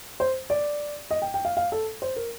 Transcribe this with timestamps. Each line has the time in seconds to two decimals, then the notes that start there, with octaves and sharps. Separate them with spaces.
0.20 C5
0.50 D5
1.11 D#5
1.22 G5
1.34 G5
1.45 F5
1.57 F5
1.72 A4
2.02 C5
2.16 A#4